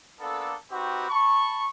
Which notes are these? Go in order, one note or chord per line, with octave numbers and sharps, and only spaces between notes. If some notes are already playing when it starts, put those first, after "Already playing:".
A#3 B3 D4 A4
C4 D#4 F#4 G4 B4
A5 B5 C#6